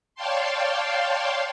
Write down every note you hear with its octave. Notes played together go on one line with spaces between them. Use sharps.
C#5 D5 F5 G5 A5 C6